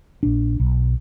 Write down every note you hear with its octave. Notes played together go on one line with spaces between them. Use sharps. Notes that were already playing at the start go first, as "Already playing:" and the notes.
A#1 D4
B1